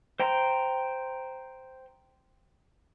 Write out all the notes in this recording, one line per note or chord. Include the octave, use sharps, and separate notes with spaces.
C5 G5 A#5 C6